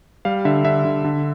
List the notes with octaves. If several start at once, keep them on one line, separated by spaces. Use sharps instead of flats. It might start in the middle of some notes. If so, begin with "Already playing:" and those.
G3 F5
D3 E5
D3 E5
D3
D3